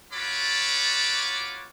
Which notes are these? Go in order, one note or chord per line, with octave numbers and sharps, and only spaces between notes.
F4 F#4 A4 C#5 B5 D6